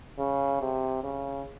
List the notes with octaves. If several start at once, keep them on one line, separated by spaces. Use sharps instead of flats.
C#3
C3
C#3